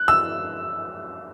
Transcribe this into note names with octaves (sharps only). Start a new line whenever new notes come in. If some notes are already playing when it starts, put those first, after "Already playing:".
Already playing: F#6
E6